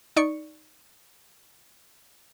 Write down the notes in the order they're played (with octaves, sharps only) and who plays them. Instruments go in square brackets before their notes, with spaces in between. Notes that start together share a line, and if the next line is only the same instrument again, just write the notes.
[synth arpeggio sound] D#4 D5 C#6 C#7